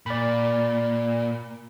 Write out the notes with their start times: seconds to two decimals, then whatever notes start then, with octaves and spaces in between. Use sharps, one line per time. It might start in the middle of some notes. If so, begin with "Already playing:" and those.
0.06 A#2 D5 B5